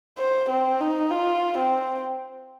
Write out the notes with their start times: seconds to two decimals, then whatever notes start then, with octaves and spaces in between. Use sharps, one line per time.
0.18 C5
0.49 C4
0.80 D#4
1.11 F4
1.58 C4